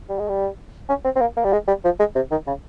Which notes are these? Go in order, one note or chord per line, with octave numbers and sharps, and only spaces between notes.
G3
G#3
G3
C#4
C4
C4
A#3
A#3
G3
G#3
G3
F3
G#3
C3
D#3
C#3